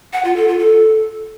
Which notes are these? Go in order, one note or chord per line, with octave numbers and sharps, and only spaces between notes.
F#5
F4
A4
F4
A4